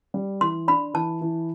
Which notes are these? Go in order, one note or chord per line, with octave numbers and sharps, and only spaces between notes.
G3
E3 C6
D4 B5
E3 A5
E3